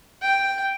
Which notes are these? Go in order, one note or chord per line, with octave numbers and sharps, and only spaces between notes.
G5